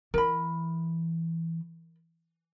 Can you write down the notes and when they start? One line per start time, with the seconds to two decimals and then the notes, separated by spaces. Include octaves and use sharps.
0.14 E3 A#4 B5